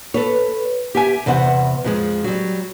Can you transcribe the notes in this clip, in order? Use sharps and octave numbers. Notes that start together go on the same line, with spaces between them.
A4 B4 C#5
G4 E5 G#5
E2 C3 B3 C5 F#5
F2 F3 G#3
F#3 G3